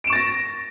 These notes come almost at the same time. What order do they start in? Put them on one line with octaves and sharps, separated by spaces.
D7 E7 C#6 A6 A#6